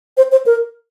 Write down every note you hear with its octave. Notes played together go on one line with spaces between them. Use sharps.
C5
C5
A#4